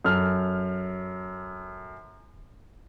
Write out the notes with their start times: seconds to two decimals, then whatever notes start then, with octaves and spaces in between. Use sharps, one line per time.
0.05 F#2 A4 F6